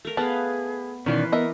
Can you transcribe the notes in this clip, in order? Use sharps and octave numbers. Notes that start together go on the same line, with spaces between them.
A3 A#4
B3 G#4 B4 F5 A5
B2 D#3 E3 C#4 B4 D5 C6
B3 A#4 D#5 E5